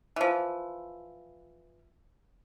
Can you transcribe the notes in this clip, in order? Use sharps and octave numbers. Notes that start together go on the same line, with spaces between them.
E3 F3